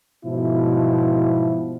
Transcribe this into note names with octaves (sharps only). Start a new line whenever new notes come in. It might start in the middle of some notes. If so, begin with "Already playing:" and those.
G#2 B2 F3 E4